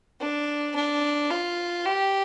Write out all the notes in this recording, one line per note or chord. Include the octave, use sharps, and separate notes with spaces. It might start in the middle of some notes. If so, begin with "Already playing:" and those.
D4
D4
F4
G4